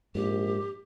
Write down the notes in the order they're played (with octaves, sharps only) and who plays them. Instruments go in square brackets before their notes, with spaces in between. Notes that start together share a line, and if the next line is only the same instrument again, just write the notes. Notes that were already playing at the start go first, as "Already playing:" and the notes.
[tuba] A#1 [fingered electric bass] G#2 [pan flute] G4